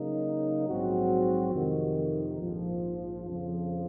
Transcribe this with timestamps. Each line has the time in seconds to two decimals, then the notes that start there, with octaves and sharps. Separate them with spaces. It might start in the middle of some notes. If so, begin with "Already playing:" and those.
Already playing: C#3 F#3 A#3 D#4
0.67 A#1 G#2 F#3 C4 F#4
1.53 F2 C3 D#3
2.40 A#1 G#2 F3
3.26 F2 C#3 F3